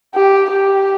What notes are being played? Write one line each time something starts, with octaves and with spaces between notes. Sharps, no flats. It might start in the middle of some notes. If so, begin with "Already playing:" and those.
G4
G4